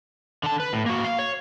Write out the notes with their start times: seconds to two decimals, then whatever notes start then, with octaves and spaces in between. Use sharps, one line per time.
0.43 D3 A5
0.60 B4
0.73 A2
0.86 A#3 F#4
1.04 F5
1.19 C#5